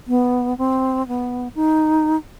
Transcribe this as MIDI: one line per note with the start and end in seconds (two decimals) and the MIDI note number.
0.08 0.57 59
0.58 1.06 60
1.08 1.48 59
1.55 2.17 63